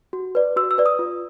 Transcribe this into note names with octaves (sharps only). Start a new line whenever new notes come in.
F#4
B4 D5
F#4 E6
E6
B4 D5
D#6
F4